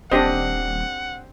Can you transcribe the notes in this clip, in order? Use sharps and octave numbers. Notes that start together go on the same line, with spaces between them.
D#1 C4 D4 G4 D#5 F#5